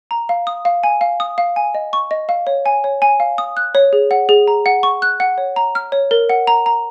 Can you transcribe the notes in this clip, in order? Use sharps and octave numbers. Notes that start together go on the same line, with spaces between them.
A#5
F5
D#6
F5
G#5
F5
D#6
F5
G#5
D#5
C#6
D#5
F5
C#5
G#5
C#5
G#5
F5
D#6
F#6
C#5
G#4
F#5
G#4
A#5
F#5
C#6
F#6
F#5
C#5
A#5
F6
C#5
A#4
F#5
A#5
A#5